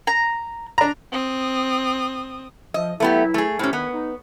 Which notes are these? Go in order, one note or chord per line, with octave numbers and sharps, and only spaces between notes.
A#5
D4 A#5
C4 D#6
F3 D#5
E3 F#3 A3 B3 E4 G4
A3 G#4
A2 C4 C#4 D#4 G4
D#3 B3 B4
D#4